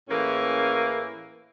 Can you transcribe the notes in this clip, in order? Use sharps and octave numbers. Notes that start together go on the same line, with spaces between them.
A2 E3 A#3 C#4 G#4